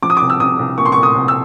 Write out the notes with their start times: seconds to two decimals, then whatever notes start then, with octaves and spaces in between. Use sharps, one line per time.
0.02 F3 D6
0.10 D#6
0.17 C2 D6
0.30 E6
0.40 C2 D#6
0.59 C2
0.78 A#2 C#6
0.85 C6
0.92 A#2 C#6
1.03 D#6
1.15 C2
1.28 E6